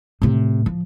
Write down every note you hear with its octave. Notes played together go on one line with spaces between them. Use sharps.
A2 C3
F3